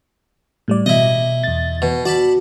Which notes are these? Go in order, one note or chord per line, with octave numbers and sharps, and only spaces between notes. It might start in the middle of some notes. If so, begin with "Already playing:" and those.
A2 G3 D5
B2 E4 D#5
E2 A6
B2
F#4 D5 A5 B5